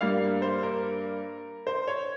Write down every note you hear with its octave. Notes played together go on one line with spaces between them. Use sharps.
G2 G3 A#3 F5
C5
A#4
C5
C#5